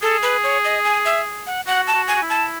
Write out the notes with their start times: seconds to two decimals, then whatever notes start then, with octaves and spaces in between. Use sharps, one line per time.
0.02 G#4 A4
0.22 B4
0.44 C#5
0.65 D#5
0.84 G#5
1.05 E5
1.47 F#5
1.67 F#4 F#5
1.87 A5
1.94 F#4
2.08 G#5
2.16 F#4
2.22 E4
2.29 A5